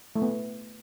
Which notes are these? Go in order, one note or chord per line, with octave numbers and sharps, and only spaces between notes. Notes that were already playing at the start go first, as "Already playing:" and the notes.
A3
B3